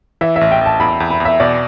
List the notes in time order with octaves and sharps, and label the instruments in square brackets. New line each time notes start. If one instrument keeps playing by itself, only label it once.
[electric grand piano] E3 [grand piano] E5
[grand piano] E5
[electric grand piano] A1
[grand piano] G5
[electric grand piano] A1 [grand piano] A5
[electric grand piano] E2 [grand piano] B5
[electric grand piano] E2
[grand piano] B5
[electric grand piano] E2
[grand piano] E5
[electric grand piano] B2 [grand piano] D5